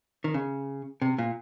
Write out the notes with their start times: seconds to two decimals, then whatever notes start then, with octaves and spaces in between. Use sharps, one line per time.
0.24 D#3
0.34 C#3
1.02 C3
1.18 A#2